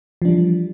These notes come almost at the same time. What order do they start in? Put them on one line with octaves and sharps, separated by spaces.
F3 D4 G3 E3